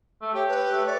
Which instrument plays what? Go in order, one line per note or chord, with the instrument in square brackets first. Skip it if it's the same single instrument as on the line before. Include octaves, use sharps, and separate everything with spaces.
[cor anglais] A3
[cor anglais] G4 [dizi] C#5
[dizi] B4
[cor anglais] A3
[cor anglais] C#5 [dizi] D5